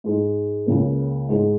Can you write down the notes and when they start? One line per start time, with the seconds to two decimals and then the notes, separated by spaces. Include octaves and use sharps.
0.04 G#2 G#3 D#4
0.66 C#2 C#3 A#3
1.29 G#2 G#3 D#4